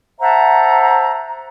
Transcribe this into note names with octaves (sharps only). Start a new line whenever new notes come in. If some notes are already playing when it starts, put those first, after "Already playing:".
C5 E5 F#5 A5 A#5